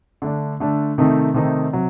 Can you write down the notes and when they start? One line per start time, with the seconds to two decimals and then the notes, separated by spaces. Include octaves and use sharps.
0.22 D3 A3 D4
0.60 D3 A3 D4
0.98 C3 D#3 A3 C4 D#4
1.34 C3 D#3 A3 C4 D#4
1.73 C3 F#3